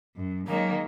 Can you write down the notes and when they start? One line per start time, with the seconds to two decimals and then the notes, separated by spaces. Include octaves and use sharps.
0.16 F#2
0.47 D#3 F#3 G#3 A#3